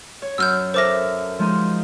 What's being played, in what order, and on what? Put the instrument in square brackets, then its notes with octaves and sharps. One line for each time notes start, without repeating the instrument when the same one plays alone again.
[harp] C#5
[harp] F#2 [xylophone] E6 F6 G6
[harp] A4 A#4 E5 [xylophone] C5 D6 A#6
[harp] F3 G#3 D#4